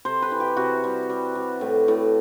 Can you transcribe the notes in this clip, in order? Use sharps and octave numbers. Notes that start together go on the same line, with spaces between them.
C3 C5
B4
E3
G4
C3 F#4
G3
G3
G3
A2
A2